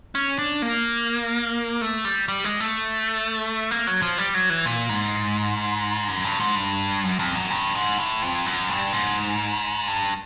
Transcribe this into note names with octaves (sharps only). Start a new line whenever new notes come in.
C#4
D4
A#3
A3
G3
G3
G#3
A3
A#3
F#3
F3
G3
F#3
E3
A#2
G#2
F#2
G2
G#2
G2
F#2
F2
F#2
G2
G#2
A2
F2
F#2
G2
G#2
G2